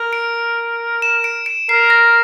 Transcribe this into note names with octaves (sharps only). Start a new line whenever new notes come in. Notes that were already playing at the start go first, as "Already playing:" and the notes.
Already playing: A#4
D7
E7
D7
D7
A#4 C7
A#6